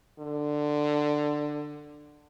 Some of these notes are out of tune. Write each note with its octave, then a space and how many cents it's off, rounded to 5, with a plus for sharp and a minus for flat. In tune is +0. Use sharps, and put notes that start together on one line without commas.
D3 +15